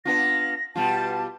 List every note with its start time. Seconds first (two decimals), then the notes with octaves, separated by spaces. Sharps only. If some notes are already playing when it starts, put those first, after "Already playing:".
0.05 B3 D4 F4 A#6
0.76 B2 G3 F4 A5